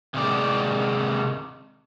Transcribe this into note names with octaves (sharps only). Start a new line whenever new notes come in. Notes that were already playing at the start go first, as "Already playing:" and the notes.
C3 D#3 G3 G#3 D5